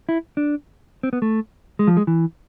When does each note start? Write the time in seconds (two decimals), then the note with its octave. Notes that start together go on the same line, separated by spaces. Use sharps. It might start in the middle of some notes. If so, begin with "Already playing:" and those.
0.09 E4
0.37 D4
1.03 C4
1.13 B3
1.22 A3
1.79 G#3
1.87 F3
1.97 G#3
2.07 E3